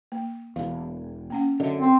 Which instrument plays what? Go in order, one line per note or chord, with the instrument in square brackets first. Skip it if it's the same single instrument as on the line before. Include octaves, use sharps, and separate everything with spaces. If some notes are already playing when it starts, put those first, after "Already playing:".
[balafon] A#3
[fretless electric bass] E1 E2 [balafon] F5
[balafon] A#3 C#4 F#5
[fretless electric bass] F#2 D3 [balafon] D#5 E5
[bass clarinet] C4